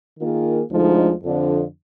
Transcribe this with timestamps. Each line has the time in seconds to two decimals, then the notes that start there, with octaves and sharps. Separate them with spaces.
0.19 D#3 A#3 F4 G#4
0.71 D2 D3 F3 G#3 D#4
1.22 F2 D3 F3